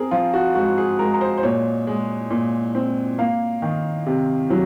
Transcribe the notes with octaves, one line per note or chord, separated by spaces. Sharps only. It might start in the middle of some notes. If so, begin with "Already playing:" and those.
Already playing: C4 G#4 A#4
F3 F4
F#4
G#2 F#4
G#4
G#3 A#4
A#4
C5
C5
A#2 C#5
G#3
A#2
C4
A#3 F5
D#3
C3
F#3